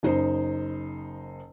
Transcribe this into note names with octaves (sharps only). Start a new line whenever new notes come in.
F#1 D#4 C5